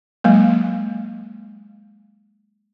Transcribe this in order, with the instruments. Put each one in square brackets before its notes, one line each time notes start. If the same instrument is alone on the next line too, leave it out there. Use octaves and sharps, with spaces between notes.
[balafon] F#3 G#3 A#3